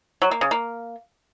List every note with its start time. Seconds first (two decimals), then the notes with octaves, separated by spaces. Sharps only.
0.22 F#3
0.31 A#3
0.41 C#3
0.51 A#3